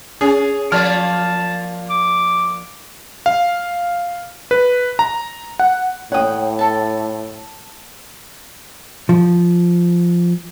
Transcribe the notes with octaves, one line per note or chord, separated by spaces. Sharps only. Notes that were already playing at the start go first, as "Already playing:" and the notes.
C#4 G#4
F3 A#3 D5 A5 F6
D6
F5
B4
A#5
F#5
A2 C#5 F#5 G5 D#6
A4 A5
F3